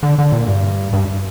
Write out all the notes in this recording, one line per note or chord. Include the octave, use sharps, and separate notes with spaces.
D3
D3
A#2
G2
G2